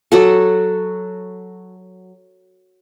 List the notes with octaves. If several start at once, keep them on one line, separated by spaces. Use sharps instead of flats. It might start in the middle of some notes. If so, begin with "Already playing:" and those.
F#3 F#4 A4